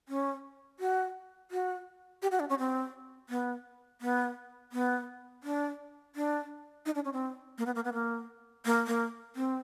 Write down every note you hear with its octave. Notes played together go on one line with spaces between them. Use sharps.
C#4
F#4
F#4
G4
F#4
D4
C#4
C4
B3
B3
B3
D4
D4
D#4
D4
C#4
C4
A#3
B3
A#3
B3
A#3
A#3
A#3
C4